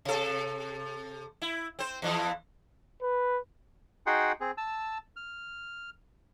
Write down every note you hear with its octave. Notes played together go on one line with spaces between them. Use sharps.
C3 A4
E4
C4 C5
E2 E3 F3
B4
D#4 F#4 G#4 F#5 G5 C6
C4 G#4
A5 E6
F6